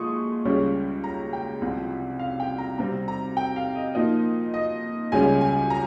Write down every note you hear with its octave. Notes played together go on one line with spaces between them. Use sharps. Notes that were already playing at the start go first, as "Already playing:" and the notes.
Already playing: A#2 F3 G#3 C#6 D#6
C#2 C#3 G3 C#4
A#5
G5
C2 C3 F3
F5
G5
A#5
C3 G3 C4 A#5
A#5
G5
F5
D#5
A#2 F3 A#3 D#4
D#5
C#2 C#3 G3 C#4 G#5
G#5
A#5